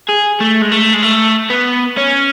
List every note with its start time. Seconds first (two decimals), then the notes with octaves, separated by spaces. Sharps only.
0.09 G#4
0.40 A3
0.62 G#3
0.72 A3
0.94 G#3
1.03 A3
1.50 B3
1.98 C#4